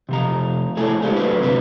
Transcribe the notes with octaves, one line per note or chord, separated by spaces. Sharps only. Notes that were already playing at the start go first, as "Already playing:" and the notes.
C3 F3 A#5
A3 E4 G#4 A4 C#5
G#3 A3 D4 E4 G4 C5
D3 F#3 G#4 B4
G#2 C3 C4 D4 B4